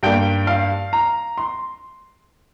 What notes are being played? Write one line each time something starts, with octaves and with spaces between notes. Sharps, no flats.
G2 G3 A#3 G5
F5
A#5
C6